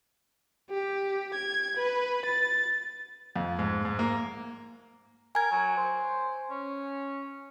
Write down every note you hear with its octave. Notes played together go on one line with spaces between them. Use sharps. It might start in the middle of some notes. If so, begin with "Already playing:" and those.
G4
G#6
B4
A6
F2
G#2
G#2
A#3
A#4 G#5 G#6
F#3
C5
C#4